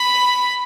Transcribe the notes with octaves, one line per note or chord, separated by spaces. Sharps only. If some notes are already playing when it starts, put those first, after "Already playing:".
Already playing: B5